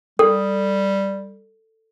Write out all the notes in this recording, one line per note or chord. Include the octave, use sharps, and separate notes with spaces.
G3 A4